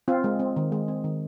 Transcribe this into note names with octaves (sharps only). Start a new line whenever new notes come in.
C4 F4
G#3
C4
D#3
G#3
C4
D#3